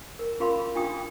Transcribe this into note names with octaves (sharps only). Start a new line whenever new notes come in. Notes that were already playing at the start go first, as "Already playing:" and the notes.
A#4
C#4 F4 A#4 F5 B5 C6
D4 F4 G5 D#6